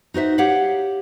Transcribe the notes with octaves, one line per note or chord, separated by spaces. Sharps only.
D#4 F#4 C5 E5
G4 C#5 F5 F#5